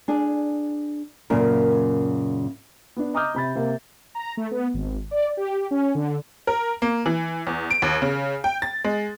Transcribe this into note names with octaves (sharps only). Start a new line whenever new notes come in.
D4 G#4
F#2 A#2 C#3 A#4
B3 D4
D#5 A#5 D6 D#6 F6 G6
C3 B5 A6
C3 A#3
A#5
A3
B3
G#1
D5
G4
C#4
D3
A#4
A#3
E3
E2
D7
D#2
C#3
G5
A6
G#3